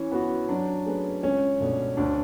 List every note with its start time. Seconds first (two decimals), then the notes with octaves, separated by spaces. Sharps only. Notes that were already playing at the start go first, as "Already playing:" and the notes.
Already playing: E3 C#4
0.12 B3 F#4
0.49 F#3 D4
0.86 A3 C#4 G#4 B4
1.23 C#2 C#4
1.60 B2 A3 D4
1.97 D2 D4